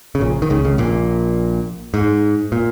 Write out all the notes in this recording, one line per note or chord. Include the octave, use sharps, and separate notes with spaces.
C#3
A#1 A#2
D#3
C#2 C#3
C#2 C#3
A#1 A#2
G#2
A#2